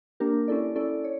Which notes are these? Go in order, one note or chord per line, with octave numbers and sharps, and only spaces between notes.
A#3 D4 G4 A#4
C#4 E4 A4 D5
C#4 E4 A4 D5
C#5